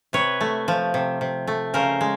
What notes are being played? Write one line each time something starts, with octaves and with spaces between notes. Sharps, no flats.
C3 B4 C#5
A3
F3
C3
C3
A3
C#3 A#4 C5
G#3